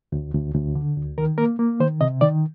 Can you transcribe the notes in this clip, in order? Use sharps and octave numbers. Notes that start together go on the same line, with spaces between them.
D2
D2
D2
D3
D2
D#3 A#4
A#3 A#4
A#3
D#3 C5
C3 D#5
D#3 D5